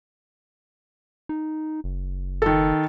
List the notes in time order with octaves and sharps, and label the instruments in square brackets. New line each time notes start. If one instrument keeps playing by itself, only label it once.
[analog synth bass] D#4
F#1
[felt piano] D#3 A4